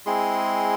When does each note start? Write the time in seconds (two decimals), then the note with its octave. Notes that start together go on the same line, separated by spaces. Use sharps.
0.06 G#3 C4 E4 G#4 C6